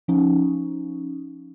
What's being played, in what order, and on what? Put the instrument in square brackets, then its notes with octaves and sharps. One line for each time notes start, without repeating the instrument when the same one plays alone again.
[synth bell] F3 C#4 D#4